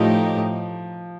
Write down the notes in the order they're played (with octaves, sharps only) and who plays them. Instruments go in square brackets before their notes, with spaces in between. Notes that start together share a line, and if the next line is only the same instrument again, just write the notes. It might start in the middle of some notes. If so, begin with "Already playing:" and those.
Already playing: [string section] A2 A3 D#4 G4 [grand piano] F3